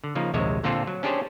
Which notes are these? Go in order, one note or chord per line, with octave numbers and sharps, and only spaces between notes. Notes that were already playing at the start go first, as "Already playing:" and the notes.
D3
C#3 F3 A#3 D#4
A#1 D#2 C3 G#3 C#5 E5
A#2 D3 A#3 C4 F4 A4
F#3
C#4 D4 G4 G#4 C5 C#5